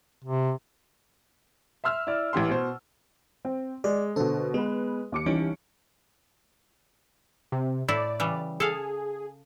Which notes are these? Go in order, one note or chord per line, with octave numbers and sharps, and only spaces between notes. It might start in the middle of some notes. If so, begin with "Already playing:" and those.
C3
E5 C6 E6 F6
E4 D5
A1 E3 G4 C6
B2 C5
C4
G#3 D5
B2 D3 A4 C5
G#3 B3 B4
D#2 D6 C#7
C2 E3 C#4 D#4 D7
C3
A2 E4 D5
C#3 E3 G3
G#4 A4 F5